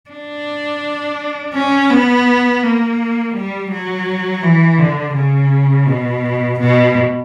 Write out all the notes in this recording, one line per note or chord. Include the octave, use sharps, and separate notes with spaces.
D4
C#4
B3
A#3
G3
F#3
E3
D3
C#3
B2
B2